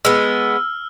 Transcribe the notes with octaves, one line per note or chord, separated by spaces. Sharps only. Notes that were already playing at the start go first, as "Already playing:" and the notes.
G#3 B3 E6 F6